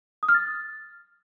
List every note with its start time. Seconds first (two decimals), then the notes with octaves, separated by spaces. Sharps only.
0.23 D#6
0.29 F6
0.34 A6